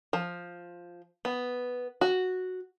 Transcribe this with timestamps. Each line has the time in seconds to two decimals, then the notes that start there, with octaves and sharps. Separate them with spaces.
0.13 F3
1.25 B3
2.01 F#4